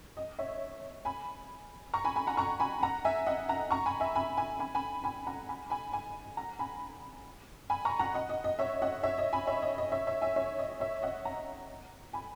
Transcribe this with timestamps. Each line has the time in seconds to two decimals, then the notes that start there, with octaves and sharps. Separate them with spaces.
0.17 D#5
0.39 C#5 E5
1.05 G#5 B5
1.94 A#5 C#6
2.04 G#5 B5
2.16 G#5 B5
2.27 F#5 A#5
2.37 A#5 C#6
2.60 G#5 B5
2.83 F#5 A#5
3.05 E5 G#5
3.26 D#5 F#5
3.49 F#5 A#5
3.71 A#5 C#6
3.86 G#5 B5
4.00 E5 G#5
4.15 G#5 B5
4.37 G#5 B5
4.60 G#5 B5
4.75 G#5 B5
5.04 G#5 B5
5.27 F#5 A#5
5.49 G#5 B5
5.70 G#5 B5
5.92 G#5 B5
6.37 F#5 A#5
6.59 G#5 B5
7.70 G#5 B5
7.85 A#5 C#6
7.99 F#5 A#5
8.14 D#5 F#5
8.29 D#5
8.44 D#5
8.59 C#5 E5
8.82 D#5 F#5
9.03 C#5 E5
9.18 D#5
9.33 G#5 B5
9.47 C#5 E5
9.62 D#5
9.78 D#5
9.92 C#5 E5
10.07 C#5 E5
10.21 E5 G#5
10.36 C#5 E5
10.59 D#5
10.80 C#5 E5
11.02 D#5 F#5
11.25 F#5 A#5
12.13 G#5 B5